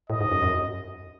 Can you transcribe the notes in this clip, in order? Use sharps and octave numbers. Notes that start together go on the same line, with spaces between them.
A2 D#5
G#2
F#2
F#2